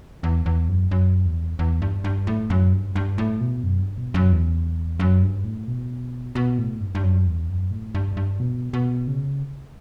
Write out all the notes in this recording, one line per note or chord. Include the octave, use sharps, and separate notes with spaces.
E2
E2
F#2
F#2
E2
E2
G2
G2
A2
F#2
G2
G2
A2
B2
F#2
G2
B2
F#2
E2
F#2
G2
A2
B2
B2
A2
G2
G2
F#2
E2
F#2
A2
G2
G2
B2
B2
C#3